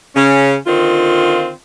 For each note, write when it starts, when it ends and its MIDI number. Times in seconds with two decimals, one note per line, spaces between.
0.16 0.56 49
0.16 0.56 61
0.66 1.51 50
0.66 1.51 51
0.66 1.51 60
0.66 1.51 65